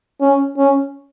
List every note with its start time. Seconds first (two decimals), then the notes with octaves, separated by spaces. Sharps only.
0.21 C#4
0.57 C#4